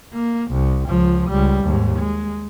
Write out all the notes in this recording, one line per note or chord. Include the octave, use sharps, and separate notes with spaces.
A#3
C2
C#2 F3
C#2 G3
D#2 G#2
G#3